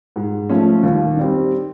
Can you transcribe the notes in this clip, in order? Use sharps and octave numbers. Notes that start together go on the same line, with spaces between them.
G#2
F3 A3 C#4
D#2
D#3 G3 C4